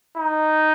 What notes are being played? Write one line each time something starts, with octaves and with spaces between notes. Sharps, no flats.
D#4